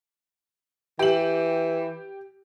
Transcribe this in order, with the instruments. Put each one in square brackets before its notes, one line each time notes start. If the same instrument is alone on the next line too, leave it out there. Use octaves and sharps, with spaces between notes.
[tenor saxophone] E3 [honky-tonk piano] G4 F#7